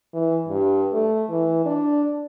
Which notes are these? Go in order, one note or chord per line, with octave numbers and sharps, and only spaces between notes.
E3
G2
A3
E3
D4